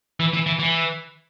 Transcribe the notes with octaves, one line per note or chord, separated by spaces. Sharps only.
E3
E3
E3
E3